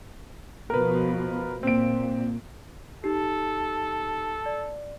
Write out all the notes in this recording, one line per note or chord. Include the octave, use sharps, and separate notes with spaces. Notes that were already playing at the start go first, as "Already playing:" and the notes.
B2 F3 A#4 B4
A#2 C4 D7
D#4 G4 A4
D5